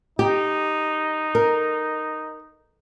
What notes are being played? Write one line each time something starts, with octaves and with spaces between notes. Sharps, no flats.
D#4 G4
A#4